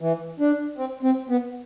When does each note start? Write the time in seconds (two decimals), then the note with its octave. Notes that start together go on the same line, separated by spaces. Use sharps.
0.01 E3
0.40 D4
0.78 C4
1.03 C4
1.29 B3